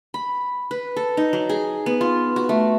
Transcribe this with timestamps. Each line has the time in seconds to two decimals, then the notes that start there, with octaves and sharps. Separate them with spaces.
0.14 B5
0.71 B4
0.96 A4
1.17 D#4
1.33 F#3
1.49 G#4
1.86 B3
2.01 F4
2.36 F#4
2.49 A3